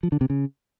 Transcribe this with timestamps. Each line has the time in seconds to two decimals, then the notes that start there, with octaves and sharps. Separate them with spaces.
0.03 F3
0.12 D3
0.21 C3
0.30 C#3